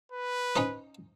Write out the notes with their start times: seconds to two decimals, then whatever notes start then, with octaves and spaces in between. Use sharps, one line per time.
0.12 B4
0.56 C#4 D#4 C5